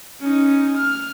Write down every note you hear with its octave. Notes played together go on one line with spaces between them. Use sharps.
C#4 D#4
F6